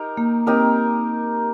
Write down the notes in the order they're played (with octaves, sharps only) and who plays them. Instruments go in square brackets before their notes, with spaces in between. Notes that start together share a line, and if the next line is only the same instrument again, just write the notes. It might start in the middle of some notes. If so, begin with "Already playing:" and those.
Already playing: [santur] D#4 G4 A#4
[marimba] A#3
[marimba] C4 [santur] D#4 G4 A#4